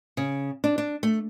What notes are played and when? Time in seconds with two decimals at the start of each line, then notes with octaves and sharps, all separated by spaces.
0.17 C#3
0.64 D4
0.78 D4
1.03 A3